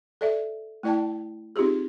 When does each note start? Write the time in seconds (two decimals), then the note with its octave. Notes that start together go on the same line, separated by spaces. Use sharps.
0.21 A4 D5 E5
0.83 A3 E4 D5 G5 A5
1.56 C4 D#4 F4 G4 G#4